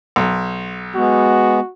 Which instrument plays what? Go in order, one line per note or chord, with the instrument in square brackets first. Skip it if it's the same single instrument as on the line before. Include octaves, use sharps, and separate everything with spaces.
[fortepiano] B1
[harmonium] G#3 B3 [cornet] F#4